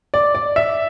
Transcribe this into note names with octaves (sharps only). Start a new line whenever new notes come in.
D5
D5
E5